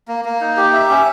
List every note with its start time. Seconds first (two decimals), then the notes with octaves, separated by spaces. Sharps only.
0.08 A#3
0.25 A#3
0.41 D#4
0.57 G4
0.73 E5
0.90 C#4